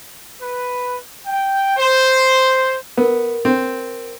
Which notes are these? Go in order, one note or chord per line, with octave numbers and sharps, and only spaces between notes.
B4
G5
C5
B3 A#4
C4